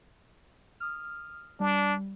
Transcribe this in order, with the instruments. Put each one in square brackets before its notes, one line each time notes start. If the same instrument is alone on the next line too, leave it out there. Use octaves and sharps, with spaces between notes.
[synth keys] D#6 F6
[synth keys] G3 [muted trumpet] D4